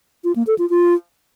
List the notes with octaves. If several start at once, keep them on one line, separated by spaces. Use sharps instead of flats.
F4
A#3
A4
F4
F4